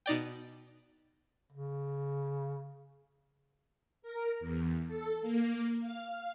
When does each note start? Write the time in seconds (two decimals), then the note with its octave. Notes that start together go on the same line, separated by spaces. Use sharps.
0.06 B2 D#4 D5 G5
1.53 C#3
4.02 A#4
4.40 E2
4.87 A4
5.21 A#3
5.80 F5